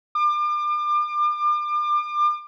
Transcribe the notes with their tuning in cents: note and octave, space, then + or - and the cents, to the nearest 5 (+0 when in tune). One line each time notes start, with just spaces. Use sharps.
D6 +35